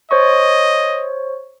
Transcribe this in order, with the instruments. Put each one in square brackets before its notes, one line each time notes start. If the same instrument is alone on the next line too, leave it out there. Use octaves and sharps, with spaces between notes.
[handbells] C5 C#5 C#6 [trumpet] D#5